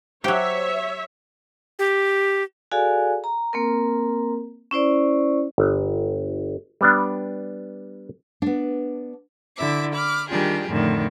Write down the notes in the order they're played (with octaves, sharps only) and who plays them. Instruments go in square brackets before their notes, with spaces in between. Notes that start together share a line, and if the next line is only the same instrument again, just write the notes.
[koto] F#3 G4 [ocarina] C5 [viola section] C#5 E5
[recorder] G4
[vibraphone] F#4 G#4 A4 D5 F5 G#5
A#5
A#3 C4 A#4
C#4 E4 C5 D5
[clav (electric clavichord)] G1
G3 B3 D4
[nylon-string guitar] B3 D4
[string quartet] D3 E4 E5 D6
B5 D6 F6
D#3 G3 D4 F4 G4 G#4
F2 A2 D3 D#3